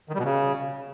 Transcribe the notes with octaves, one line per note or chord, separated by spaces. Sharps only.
D#3
G3
B2
C#3